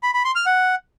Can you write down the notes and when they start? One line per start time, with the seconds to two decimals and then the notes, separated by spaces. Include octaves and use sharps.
0.03 B5
0.14 B5
0.25 C6
0.35 F6
0.46 F#5